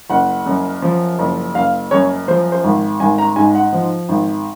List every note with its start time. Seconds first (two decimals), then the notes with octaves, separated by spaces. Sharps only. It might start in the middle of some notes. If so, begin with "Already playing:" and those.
0.10 F#1 F#5
0.46 F#2
0.82 F3
1.19 F#1
1.55 F#1 F5
1.91 F#2 C#5
2.28 F3 C5
2.52 C5
2.64 G#1
3.00 G#1 G#5
3.18 A#5
3.36 G#2 G#5
3.55 F#5
3.73 F3
4.09 G#1